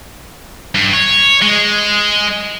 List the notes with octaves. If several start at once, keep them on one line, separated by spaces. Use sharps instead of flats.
G2
C#5
G#3